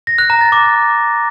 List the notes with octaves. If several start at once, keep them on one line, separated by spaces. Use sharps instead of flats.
A#6
F#6
A#5
A6
D6